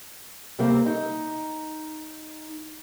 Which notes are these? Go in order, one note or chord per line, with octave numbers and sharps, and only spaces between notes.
C3 G3 A#3 C4
D#4